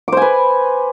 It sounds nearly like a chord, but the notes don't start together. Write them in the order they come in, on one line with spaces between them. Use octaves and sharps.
D6 C5 G#5 B4